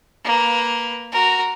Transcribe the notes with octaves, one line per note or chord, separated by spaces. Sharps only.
A#3 B4
F#4 A#4